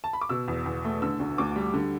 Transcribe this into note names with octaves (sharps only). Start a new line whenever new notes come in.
A5
B5
D6
B2 E6
E2
E2
A3
D3 E6
D2
D2 D6
G3
D3